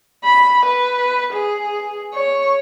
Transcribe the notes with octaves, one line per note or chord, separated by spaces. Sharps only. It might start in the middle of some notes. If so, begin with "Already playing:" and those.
B5
B4
G#4
C#5